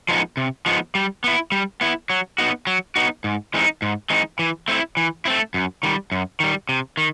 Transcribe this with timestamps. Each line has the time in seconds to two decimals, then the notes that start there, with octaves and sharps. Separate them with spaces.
0.09 F3 G#3 B3 D#4
0.37 C3
0.66 F3 G#3 B3 D#4
0.95 G3
1.24 B3 E4
1.52 G3
1.81 B3 E4
2.10 F#3
2.38 B3 D#4 F#4
2.67 F#3
2.96 B3 D#4 F#4
3.24 G#2
3.54 E3 G#3 C4 D#4
3.82 G#2
4.10 E3 G#3 C4 D#4
4.39 E3
4.68 A3 C4 E4
4.97 E3
5.25 A3 C4 E4
5.54 F#2
5.83 D#3 G3
6.12 F#2
6.40 D#3 G3
6.69 C3
6.97 D#3